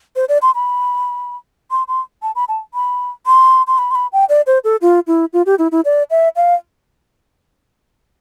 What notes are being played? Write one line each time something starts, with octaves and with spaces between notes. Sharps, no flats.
C5
D5
C6
B5
C6
C6
A5
B5
A5
B5
C6
C6
B5
C6
B5
G5
D5
C5
A4
F4
E4
F4
G4
E4
E4
D5
E5
F5